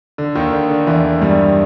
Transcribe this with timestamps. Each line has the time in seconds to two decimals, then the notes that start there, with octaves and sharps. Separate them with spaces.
0.18 D3
0.35 D#2 D#3
0.53 D3
0.70 D3
0.87 E2 E3
1.21 G2 G3